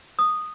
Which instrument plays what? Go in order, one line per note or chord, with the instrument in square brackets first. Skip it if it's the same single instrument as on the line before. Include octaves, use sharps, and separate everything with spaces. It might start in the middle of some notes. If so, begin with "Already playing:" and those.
[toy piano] D#6